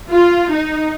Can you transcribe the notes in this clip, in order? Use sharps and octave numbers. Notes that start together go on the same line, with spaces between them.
F4
D#4